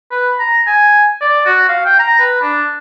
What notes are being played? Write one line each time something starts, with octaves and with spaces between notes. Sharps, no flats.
B4
A#5
G#5
D5
F#4
F5
G5
A#5
B4
D4